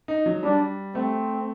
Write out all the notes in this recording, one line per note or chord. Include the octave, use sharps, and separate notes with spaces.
D#4
F#3
G3 D4
A3 C4